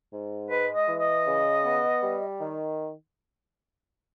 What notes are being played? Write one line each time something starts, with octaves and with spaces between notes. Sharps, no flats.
G#2
G#3 B4
D#5
E3
D#5
C#3
B3
G3
D#3